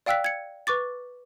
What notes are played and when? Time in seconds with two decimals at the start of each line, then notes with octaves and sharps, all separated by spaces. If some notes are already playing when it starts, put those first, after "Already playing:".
0.06 D5 F5 G5 E6 F#6 B6
0.24 G#6 C#7
0.67 B4 C#6 D6 A6